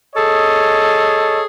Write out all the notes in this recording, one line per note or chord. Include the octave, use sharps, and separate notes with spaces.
G#4 A4 C#5 D#5